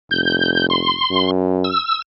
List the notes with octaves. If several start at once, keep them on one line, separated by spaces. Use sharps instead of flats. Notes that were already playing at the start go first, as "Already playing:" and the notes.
F1 G6
C6
F#2
E6